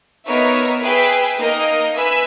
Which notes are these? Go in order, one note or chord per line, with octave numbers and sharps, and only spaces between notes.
B3 D#4 A#4 C#5 E5
G#4 B4 E5 G5
A#3 D#4 A#4 D#5
B4 E5 G#5